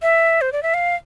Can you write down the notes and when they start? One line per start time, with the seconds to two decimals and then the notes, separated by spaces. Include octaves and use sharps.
0.02 E5
0.41 C5
0.52 D5
0.63 E5
0.74 F5